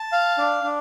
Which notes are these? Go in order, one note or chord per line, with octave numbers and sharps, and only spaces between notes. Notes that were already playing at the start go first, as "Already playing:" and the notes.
Already playing: A5
F5
D4
D4